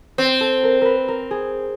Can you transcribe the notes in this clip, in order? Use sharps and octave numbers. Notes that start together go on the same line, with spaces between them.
C4
A4
A#4
A#4 B4
A#4
G#4